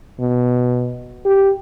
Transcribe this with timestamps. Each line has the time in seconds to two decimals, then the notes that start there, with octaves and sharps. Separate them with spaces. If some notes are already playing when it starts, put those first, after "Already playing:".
0.20 B2
1.26 G4